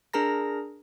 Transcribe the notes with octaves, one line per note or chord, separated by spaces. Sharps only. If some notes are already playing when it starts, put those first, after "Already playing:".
D4 G#4 A#4 A#5 A#6